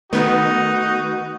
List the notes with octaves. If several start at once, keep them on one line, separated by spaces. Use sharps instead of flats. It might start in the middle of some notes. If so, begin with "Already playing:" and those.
D#3 A3 B3 D#4 F#4